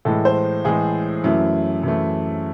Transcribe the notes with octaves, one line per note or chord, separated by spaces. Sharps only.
A2 E3 G#3 A4
C5
A2 E3 G#3 G#4
F#2 E3 A3 E4
F#2 E3 A3